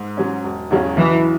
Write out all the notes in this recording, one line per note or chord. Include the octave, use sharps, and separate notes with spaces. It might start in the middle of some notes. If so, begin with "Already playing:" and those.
Already playing: G#2
F#3 C#4
E1
E2 C#3 F#3 C#4
B1 E3